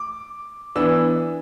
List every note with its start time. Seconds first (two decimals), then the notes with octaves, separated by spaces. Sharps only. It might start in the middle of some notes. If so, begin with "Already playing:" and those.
Already playing: D6
0.76 E3 B3 D4 E6